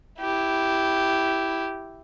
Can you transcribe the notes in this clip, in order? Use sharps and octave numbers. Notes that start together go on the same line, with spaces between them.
E4 G4